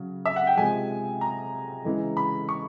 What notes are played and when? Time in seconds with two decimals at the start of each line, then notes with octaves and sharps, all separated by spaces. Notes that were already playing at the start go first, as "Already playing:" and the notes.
Already playing: C#3 F#3
0.26 E5
0.36 F#5
0.47 G5
0.57 C3 F3 G#3 G#5
1.21 A#5
1.85 C#3 E3 G#3
2.17 B5
2.49 C#6